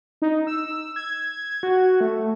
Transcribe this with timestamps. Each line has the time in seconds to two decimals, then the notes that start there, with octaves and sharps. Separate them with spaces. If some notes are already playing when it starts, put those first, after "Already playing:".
0.22 D#4
0.47 E6
0.96 G#6
1.63 F#4
2.01 A3